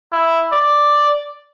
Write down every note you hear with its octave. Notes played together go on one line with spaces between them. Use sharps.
E4
D5